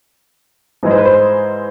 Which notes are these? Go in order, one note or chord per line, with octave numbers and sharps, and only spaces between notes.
G#2 E3 G#3
C5
B4
C5